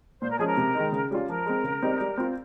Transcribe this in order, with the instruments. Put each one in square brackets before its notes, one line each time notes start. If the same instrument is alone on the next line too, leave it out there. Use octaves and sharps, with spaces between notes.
[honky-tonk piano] A#2 [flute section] C5
[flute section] A#4
[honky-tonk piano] F3 G#3 C#4 [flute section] G#4
[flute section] A#4
[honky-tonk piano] C3
D#3 G#3 D#4
C#3
G3 C#4 F4
[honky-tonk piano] F3 [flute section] A#4
[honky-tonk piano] G#3 C4
C#3
G3 C4 D#4
G3
C4 F4